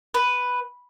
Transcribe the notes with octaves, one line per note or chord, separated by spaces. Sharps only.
B4